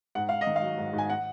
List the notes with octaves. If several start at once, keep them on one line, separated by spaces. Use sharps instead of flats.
G#2 F#5
G#2 F5
D#5
D#3
F5
F#3
G#2
G#2
G#5
F#5